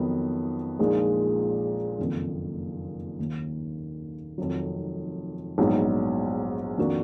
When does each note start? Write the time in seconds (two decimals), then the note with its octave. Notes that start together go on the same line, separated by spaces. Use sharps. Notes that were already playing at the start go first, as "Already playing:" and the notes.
Already playing: F2 D#3 F#3 B3
0.79 A#1 A#2 F3 G#3 D#4
1.99 F#1 F2 D#3 A#3
3.19 D#2 D#3 A#3
4.38 F1 F2 D#3 F#3
5.58 A#1 G#2 F#3 B3 D#4
6.78 F2 D#3 A#3 D4 F#4